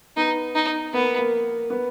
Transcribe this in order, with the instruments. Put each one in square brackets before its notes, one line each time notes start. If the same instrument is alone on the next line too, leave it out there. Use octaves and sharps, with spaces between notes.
[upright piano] B3 [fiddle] D#4
[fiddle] D#4
[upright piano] A#3 [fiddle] B3
[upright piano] A#3
B3